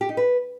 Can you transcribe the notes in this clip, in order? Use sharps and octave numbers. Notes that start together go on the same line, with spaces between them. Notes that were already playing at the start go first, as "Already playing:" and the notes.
G4
D#4
B4